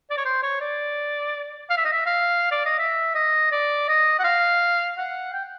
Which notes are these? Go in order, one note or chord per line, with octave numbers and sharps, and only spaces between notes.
D5
C#5
C5
C#5
D5
F5
E5
D#5
E5
F5
D5
D#5
E5
D#5
D5
D#5
F#5
F5
F#5
G5